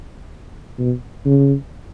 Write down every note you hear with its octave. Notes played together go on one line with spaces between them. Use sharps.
B2
C#3